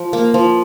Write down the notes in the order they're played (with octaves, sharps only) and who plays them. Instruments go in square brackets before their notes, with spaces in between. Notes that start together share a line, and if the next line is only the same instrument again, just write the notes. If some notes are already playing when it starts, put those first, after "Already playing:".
Already playing: [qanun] F3
A#3
F3